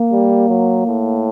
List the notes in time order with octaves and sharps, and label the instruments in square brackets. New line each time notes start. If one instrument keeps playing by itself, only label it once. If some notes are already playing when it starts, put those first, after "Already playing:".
Already playing: [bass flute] A#3
[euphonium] G3
F#3
A2